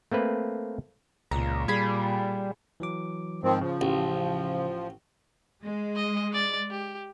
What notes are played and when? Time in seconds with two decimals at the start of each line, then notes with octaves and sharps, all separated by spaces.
0.12 A3 A#3 C4 B4
1.31 C#2 A#2 A#5
1.68 G3 G#4 B5
2.80 E3 F#3 D6
3.43 G#2 D#3 F3 C4
3.61 C#3 F3
3.81 A1
5.62 G#3
5.96 D#5
6.33 D5 A6
6.71 G4